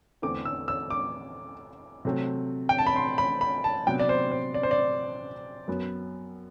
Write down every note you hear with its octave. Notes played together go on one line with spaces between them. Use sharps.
E2 D3 A3 C4 D6
E6
E6
D6
C3 F#3 A3 C4
G5
A5
B5
C6
B5
B5
A5
C3 F#3 B3 D4 G5
D5
C5
C5
D5
C5
D5
F#2 F#3 B3